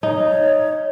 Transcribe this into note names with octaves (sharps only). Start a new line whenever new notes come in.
D#4 C#5